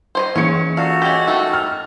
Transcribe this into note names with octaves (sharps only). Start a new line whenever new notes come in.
C5 C#5 D#5
E3 A#3 C#4 G#4 C#5 C#7
F4 F#4 A4 D5 F5
C#4 G4 D#5 D6
D#3 A3 D#4 F#4 A4
F6